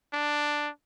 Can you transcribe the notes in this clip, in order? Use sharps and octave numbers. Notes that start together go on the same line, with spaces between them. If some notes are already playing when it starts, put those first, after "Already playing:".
D4